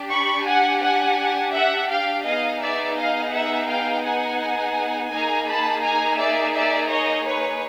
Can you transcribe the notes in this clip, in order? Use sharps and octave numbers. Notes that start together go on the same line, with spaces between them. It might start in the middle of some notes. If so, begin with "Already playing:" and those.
Already playing: D4 G4
B5 C#6
F#5 G#5
F#5 G#5
E5 F#5
F5 G5
B3 D#4 G#4 D#5 F5
D5 E5
D#5 F5
E5 F#5
F5 G5
F#5 G#5
A#3 D#4 G#4 G#5 A#5
A5 B5
G#5 A#5
D5 E5
D5 E5
C#5 D#5
B4 C#5